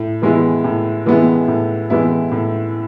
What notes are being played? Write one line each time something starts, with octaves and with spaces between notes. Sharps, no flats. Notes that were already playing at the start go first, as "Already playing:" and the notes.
Already playing: A2
E3 G#3 B3 E4
A2
E3 G#3 B3 E4
A2
E3 G#3 B3 E4
A2